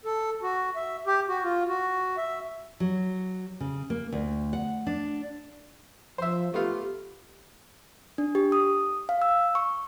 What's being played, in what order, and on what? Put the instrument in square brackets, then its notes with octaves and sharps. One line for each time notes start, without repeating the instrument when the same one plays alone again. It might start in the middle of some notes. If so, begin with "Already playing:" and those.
[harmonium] A4
F#4
E5
G4
F#4
F4
F#4
E5
[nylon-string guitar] F#3
C#3
A#3
D2
F#5
D4
[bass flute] F3 [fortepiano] C5 E5
[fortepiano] A3 B3 F4 [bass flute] G4
[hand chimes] D4
G4
D#6
F5
E6
C#6